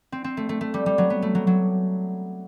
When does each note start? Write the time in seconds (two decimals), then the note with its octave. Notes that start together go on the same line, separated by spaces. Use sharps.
0.12 C4
0.24 C4
0.37 A3
0.49 A3
0.61 A3
0.74 G3
0.86 G3
0.98 F#3
1.10 B3
1.22 A3
1.35 F#3
1.47 F#3